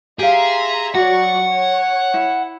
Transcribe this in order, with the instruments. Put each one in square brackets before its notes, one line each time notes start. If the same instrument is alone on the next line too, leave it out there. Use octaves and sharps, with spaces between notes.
[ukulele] G4 F5 [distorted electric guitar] G#4 [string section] E5 A#5 C6
[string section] F#3 D5 C#6 [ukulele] F#4 [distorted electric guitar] F#5
[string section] C#5
[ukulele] E4